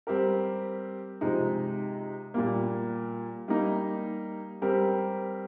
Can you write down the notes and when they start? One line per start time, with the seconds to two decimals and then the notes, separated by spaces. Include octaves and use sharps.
0.07 G3 C4 G4 A#4
1.21 C3 F3 G#3 D#4
2.34 A#2 G3 A#3
3.48 G3 A#3 D#4
4.62 G3 C4 G4 A#4